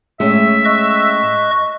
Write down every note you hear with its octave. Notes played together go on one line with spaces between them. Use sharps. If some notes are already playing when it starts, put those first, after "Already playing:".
A2 G#3 C#4 E5
D#5 C#6 F#6